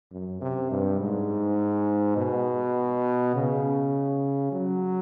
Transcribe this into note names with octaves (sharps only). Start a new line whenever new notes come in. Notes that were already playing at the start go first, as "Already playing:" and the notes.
F#2
C3
G2
G#2
B2
C#3
F#3